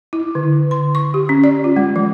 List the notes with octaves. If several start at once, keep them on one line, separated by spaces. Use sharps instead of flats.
E4
D3
C6
C#6
G4
C#4
D5
F4
G#3
F3